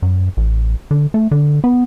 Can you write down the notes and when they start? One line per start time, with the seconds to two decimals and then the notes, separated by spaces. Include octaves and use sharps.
0.02 F#2
0.37 A1
0.91 D3
1.14 A3
1.31 D3
1.64 B3